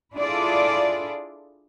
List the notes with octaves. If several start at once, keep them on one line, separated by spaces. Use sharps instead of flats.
D4 E4 F4 G#4 A4 D5